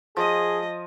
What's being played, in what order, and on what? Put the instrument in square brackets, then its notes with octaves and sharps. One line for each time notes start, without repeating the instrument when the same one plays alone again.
[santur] F3 D#6 [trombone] G#4 [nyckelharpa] D#5